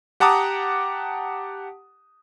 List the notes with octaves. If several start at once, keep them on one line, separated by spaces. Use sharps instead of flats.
G4 F#5 A5 A#5 D6 D#6